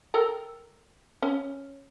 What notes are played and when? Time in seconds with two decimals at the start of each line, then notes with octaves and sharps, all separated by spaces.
0.14 A4 A#4 G5
1.22 C#4